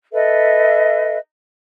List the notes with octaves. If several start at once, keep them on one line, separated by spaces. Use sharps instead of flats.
A4 B4 D#5 E5